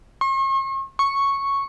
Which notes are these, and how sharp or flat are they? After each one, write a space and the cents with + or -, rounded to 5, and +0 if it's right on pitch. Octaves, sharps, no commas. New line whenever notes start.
C#6 -45
C#6 -5